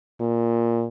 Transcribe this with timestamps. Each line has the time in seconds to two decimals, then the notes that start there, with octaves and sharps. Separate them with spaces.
0.20 A#2